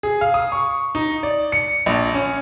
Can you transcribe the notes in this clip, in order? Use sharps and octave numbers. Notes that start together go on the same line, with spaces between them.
G#4
F5
D#6
C#6
D#4
D5
C#7
A#1
C#4